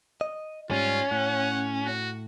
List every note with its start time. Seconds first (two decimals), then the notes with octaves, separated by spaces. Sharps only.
0.21 D#5
0.71 G#2 G3 C#4 F4
1.11 A2 F#5
1.85 F#4